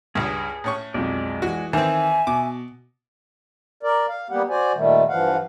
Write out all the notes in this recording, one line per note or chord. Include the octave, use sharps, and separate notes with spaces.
C#2 G2 G#4
A2 C#4 C#6
B1 F2 G#3 D5
E3 F#4
D#3 E3 C4 E5 G#5
B2 D6
A#4 D5
F5
G3 A#3 B3 G4 F#5
F#4 C5 D5 G#5
A#2 D#3 G3 A3
G2 E3 F3 F5 F#5